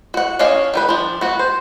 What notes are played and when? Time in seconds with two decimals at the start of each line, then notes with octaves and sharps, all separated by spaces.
0.14 F#4 F#5
0.39 C#4 D4 C#5 D#5 F5
0.74 D#3 G3 B4
0.89 F3 D4
1.21 B3 F#4
1.39 C5